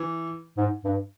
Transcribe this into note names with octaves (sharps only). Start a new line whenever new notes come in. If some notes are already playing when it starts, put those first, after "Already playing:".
Already playing: E3
G#2
G2